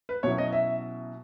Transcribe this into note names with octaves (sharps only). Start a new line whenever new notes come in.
B4
B2 F#3 C#4 E4 C#5
D#5
E5